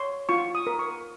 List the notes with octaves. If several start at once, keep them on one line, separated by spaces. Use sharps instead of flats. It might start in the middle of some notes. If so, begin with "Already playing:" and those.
Already playing: C#5 C6
F4 C#6
D#6
A#4
C#6